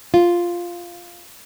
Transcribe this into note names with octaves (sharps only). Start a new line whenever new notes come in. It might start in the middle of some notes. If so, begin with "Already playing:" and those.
F4